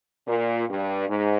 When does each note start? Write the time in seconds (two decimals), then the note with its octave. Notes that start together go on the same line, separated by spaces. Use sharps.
0.28 A#2
0.69 G2
1.09 G#2